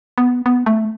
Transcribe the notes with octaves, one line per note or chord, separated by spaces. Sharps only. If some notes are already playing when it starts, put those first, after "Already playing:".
B3
B3
A3